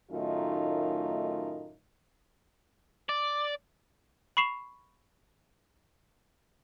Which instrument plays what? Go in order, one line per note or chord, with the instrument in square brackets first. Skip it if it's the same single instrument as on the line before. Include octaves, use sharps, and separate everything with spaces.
[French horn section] F#2 A2 D#3 A3 D#4 F4
[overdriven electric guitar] D5
[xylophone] B5 C#6 C7 E7 F7